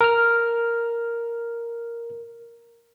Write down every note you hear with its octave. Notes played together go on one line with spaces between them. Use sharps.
A#4 F6